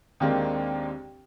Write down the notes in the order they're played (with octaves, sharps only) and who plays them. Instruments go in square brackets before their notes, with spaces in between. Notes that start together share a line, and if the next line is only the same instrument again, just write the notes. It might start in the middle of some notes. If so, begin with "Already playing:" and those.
[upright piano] D#2 D#3 G#3 A#3 C4 D4